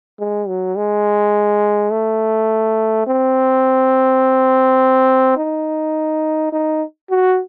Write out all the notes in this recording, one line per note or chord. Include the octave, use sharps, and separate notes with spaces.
G#3
F#3
G#3
A3
C4
D#4
D#4
F#4